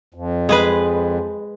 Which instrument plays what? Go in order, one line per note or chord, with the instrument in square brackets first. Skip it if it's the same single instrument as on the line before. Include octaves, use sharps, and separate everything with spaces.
[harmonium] F2
[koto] G#3 G#4 B4